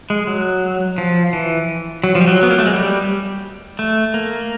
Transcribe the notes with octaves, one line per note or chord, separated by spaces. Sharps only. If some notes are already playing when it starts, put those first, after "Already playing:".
G#3
F#3
F3
E3
F#3
F3
G3
F#3
B3
A#3
A3
G#3
G3
A3
A#3